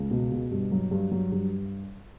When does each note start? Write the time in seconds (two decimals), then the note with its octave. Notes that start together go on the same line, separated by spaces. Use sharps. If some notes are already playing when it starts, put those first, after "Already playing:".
Already playing: C#2
0.11 B2
0.32 B2
0.51 G2
0.71 F#3
0.91 G2
1.11 F#3
1.32 G2